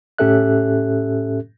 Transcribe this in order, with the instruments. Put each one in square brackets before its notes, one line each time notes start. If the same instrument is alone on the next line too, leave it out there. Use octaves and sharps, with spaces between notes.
[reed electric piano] A2 C#4 G4 A4 E5 F#6